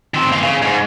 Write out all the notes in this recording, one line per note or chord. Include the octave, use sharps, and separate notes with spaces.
D#3 C4
E3 F5
C#3
G#2